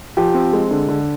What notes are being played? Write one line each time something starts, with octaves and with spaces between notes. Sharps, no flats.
F3 G4
C4
G#3
D3
D3